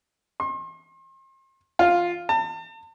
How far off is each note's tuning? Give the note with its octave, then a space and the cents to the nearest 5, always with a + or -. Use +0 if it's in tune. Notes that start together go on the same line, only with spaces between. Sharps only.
C6 +40
F4 +5
A5 +40